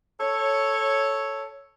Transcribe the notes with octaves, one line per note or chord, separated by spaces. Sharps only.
A4 C#5